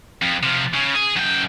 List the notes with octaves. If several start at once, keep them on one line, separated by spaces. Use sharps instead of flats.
F2
C3 F3
C#3
G#4
F#2 G5